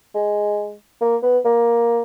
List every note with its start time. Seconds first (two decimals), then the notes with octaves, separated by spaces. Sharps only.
0.15 G#3
1.01 A#3
1.23 B3
1.45 A#3